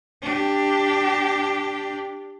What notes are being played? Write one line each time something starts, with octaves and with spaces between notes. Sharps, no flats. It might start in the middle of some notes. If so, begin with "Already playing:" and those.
D4 G4